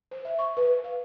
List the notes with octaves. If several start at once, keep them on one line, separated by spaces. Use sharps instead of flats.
C5
E5
C#6
B4
F5